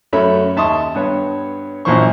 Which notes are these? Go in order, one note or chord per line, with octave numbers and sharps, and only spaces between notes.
F#2 A3 C#5 E5 B5
D#2 E5 A5 C6 C#6 D#6
G2 B3 C#5
A#1 F#2 A#2 E3 C5 C#6